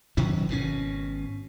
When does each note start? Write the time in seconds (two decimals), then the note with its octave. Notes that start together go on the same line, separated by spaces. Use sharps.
0.17 B2 D#3 F#3 C#4
0.49 G#1 B2 D3 C#4